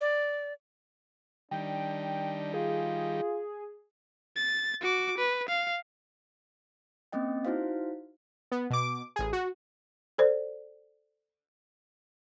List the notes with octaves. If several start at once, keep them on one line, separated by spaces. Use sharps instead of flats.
D5
D#3 G3 D4 G5
F4 G#4
A6
F#4 D6
B4
F5
A#3 C4 C#4 D#5 G5
D#4 E4 F#4 C5 F5
B3
B2 D6
A1 G#4
F#4
A4 C5 D5